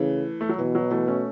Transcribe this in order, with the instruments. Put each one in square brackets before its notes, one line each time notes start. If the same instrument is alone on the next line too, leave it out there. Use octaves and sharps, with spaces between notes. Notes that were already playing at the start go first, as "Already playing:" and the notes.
Already playing: [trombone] C#3 [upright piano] E3 A3
[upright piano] A3
F#3
[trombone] B2 [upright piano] E3
[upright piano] F#3
E3 A3
A3 C#4